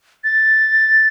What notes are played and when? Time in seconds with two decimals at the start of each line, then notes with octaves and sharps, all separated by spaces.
0.24 A6